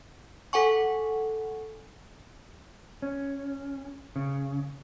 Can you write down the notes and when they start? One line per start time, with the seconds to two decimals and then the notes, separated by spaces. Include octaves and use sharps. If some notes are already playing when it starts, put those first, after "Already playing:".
0.53 A4 F#5 G#5 C#6
3.02 C#4
4.16 C#3